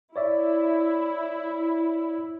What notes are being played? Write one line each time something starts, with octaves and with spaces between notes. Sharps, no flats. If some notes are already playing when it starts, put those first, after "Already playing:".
E4 C#5 D5 E5